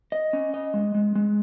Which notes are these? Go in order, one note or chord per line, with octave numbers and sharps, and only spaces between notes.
D#5
C#4
D#5
G#3
G#3
G#3